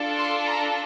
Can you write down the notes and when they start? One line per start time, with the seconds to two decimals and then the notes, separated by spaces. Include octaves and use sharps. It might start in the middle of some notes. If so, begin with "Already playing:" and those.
Already playing: D4 F4 A4
0.17 C6
0.46 A#5